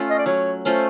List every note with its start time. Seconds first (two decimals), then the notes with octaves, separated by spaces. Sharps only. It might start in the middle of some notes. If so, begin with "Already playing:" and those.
Already playing: A3 C#4 F4
0.10 D#5
0.18 D5
0.26 F#3 C#5
0.65 A3 C#4 F4 C5